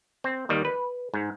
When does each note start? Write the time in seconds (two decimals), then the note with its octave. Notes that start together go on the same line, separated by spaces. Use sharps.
0.24 C4
0.49 D#2 D#3 G3
0.65 B4
1.14 G#2